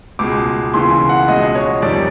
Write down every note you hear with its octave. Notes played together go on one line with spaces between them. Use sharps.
C#2 B2 G#3 D6
D#2 C#3 E3 C6
F#5
C#2 B2 G#3 D#5
C#5
F2 C3 D#3 G3 D5